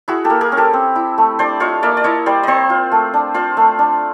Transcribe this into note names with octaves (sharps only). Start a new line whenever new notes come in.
E4 F#4 G#4
G4 A4
A#3
G#4 A#4
C#4
G4 A4
C4
E4
A3
D4 C5 D5
F4 C#5 D#5
A#3 D5 E5
D5
E4 C#5 D#5
G3 C5 D5
C4 C5 D5 D#5
F4
A3
D4
F4 C5 D5
A3
D4